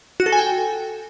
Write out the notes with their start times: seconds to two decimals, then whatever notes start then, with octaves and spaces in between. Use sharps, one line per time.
0.20 F#4
0.26 A4
0.32 G#5
0.39 G5